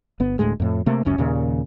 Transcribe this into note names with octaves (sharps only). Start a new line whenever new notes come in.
G1 B3
D1 D2 A2 G#3
F2 A2
C3 A3 A#3
F#1 C#2 F#2 C#4
D#2 A#2 C#3